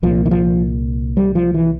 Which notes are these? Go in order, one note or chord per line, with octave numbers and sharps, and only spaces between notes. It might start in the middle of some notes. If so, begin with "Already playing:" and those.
C2 A#2 F3
E3
F3
G3
F3
E3